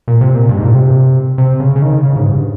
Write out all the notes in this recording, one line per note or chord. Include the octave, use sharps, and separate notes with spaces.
A#2
C3
A#2
G2
G#2
A#2
C3
C3
C#3
C#3
D#3
C#3
G#2
G2